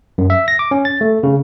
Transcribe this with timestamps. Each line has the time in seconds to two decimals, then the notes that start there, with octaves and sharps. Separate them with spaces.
0.18 F#2
0.30 E5
0.48 A#6
0.59 D6
0.71 C#4
0.85 A6
1.01 A3
1.23 C#3